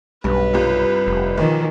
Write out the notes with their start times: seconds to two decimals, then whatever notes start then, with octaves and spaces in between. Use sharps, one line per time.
0.24 B1 G2 B4
0.53 C2 G2 F4
1.06 F1
1.38 B1 D#3 F3